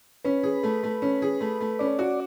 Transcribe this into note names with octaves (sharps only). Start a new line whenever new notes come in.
C#4 B4
G#4
A3
A3
C#4
G#4
A3
A3
C#4 D5
F#4